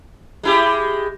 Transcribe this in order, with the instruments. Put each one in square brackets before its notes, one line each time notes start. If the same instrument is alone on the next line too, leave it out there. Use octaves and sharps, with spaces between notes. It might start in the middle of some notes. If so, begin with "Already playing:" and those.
[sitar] G#3 E4 G4